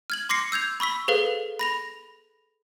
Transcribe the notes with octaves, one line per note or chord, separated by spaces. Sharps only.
F6 G#6 F#7
C6 D6 A#6 C7 C#7
E6 G6 G#6 F7
B5 C#6 E6 B6
G#4 A4 B4 C5 F5
B5 A#6 F7